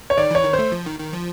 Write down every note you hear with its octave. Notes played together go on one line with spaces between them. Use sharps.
C#5
D#3 D5
E3 C#5
D#3
C5
A3
F3
D#3
D#3
F3